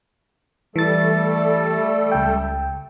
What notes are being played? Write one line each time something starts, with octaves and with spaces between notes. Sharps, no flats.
E3 G3 A3 A4 A6
C#2 G5